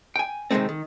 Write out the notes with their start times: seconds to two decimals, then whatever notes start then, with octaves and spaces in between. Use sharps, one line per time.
0.16 G5 G#5
0.51 C3 D#3 F#3 G#3 A3 C4
0.69 D#3